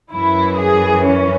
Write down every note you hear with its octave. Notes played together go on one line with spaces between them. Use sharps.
F#2 E3 E4
G#4
C#4